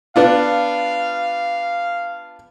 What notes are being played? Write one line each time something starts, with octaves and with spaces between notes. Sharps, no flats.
B3 D4 F4 F5